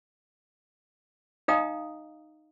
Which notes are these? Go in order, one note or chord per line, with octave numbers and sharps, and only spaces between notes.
D#4 D#5 F5 G5 A#5 D#6